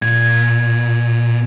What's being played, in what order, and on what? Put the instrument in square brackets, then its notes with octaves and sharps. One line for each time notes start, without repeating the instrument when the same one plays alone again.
[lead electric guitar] A#2 [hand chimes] G#6